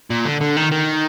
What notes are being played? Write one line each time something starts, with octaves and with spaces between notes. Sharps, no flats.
A#2
D3
D3
D#3
D#3